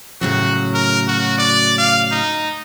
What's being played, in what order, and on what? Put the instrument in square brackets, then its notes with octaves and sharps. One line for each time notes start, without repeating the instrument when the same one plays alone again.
[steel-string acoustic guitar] A2 C#3 F#3 [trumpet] F#4
[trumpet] A#4
F#4
D5
F5
D#4